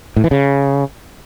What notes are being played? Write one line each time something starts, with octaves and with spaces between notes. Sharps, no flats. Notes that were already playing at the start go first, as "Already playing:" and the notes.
A2
E3
C#3